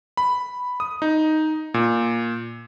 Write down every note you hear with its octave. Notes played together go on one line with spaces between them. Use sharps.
B5
D#6
D#4
A#2